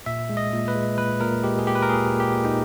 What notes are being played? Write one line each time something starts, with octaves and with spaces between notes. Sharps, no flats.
A#2 E5
G#3
D#5
A#2
B4
G#3
A#2 B4
A#2 A#4
G#3 G4
G#4
A#2 G4
B4
A#4
A#2 G#4
A#2
G4
A#2
D#4